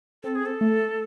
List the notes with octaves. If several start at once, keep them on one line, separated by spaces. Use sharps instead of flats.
C4 A4
G#4
A4
A3